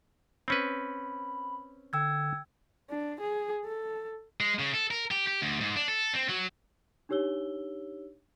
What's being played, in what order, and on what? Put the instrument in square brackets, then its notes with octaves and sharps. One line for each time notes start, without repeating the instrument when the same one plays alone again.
[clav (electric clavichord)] C4 C#4 B4 [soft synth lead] B5
[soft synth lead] D3 [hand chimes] G5 E6 G#6
[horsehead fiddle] D4
G#4
A4
[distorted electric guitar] G#3
C#3
A4
A#4
G4
G4
D2
G#2
D4
A4
C4
F#3
[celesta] D4 D#4 G4 C#5 E6 G7